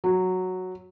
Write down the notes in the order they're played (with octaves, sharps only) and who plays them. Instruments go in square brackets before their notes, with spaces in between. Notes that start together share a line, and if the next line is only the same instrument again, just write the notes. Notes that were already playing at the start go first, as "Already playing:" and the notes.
[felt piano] F#3